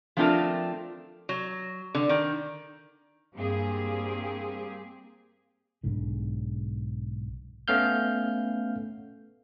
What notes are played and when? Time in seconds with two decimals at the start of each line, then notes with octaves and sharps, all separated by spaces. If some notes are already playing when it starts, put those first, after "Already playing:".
0.17 F3 A3 C4 D4 F4 A#4
1.29 F#3
1.95 D3
2.09 D#3
3.36 G2 A#3 C4 G4 G#4
5.83 B1 G#2 D3
7.68 A3 B3 C#4 F5 F6 G6